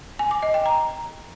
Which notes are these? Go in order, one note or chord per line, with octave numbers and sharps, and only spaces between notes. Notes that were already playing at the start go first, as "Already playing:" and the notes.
G#5
D6
D#5
G5
A#5